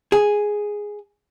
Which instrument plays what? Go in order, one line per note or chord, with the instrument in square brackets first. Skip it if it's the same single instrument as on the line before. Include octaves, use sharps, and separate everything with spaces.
[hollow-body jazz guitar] G#4